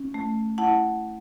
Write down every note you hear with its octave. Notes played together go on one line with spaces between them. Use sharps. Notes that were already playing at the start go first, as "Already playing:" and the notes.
Already playing: C#4
A3
E4 F#5 A5